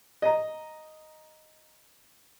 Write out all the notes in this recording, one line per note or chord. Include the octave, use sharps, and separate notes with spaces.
D#5 A#5